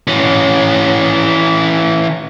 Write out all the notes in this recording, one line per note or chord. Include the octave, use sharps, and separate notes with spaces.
E3 C#4